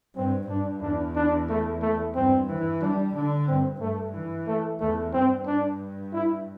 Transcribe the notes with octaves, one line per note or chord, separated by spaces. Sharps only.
G2 C4
G2 D4
E2 D4
D4
A3
A3
G2 C4
E3
G3 D4
D3 D4
G2 C4
G2 A3
E3
A3
E2 A3
G2 C4
D4
E4